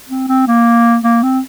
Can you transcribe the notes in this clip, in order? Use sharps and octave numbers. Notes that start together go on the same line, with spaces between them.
C4
C4
A#3
A#3
C4